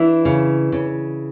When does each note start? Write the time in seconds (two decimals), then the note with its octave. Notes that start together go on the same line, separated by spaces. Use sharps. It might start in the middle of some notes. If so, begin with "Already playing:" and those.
Already playing: E3 D4 E4
0.25 C#3
0.72 C#3